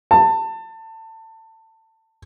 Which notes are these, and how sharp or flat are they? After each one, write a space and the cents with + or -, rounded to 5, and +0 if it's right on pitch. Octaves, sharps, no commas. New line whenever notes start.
A5 +25